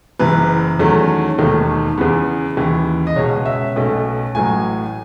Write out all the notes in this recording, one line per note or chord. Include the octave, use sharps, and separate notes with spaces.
F#1 F#2 E3 B4
E2 D#3 F#3 A3 C#4
E1 D#2 D#3 A3
E2 C#3 E3 B3
D#2 C#3 E3
D#5
C#2 B2 G#3 C#4 C#5
E5
B1 B2 A3 C#4
A1 A2 F#3 G#5